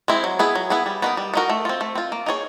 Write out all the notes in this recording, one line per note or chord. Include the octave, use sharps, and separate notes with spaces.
G#3 C4 E4
F#3
B3 E4 G#4
F#3
B3 E4 G#4
G3
B3 D#4 F#4 A#4
G3
B3 D#4 F#4 A#4
A3
C4 F4
A3
C4 F4
A#3
D#4 G#4 C#5